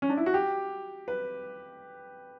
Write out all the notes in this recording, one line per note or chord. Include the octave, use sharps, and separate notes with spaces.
C#4
D4
E4
F#4
G4
B4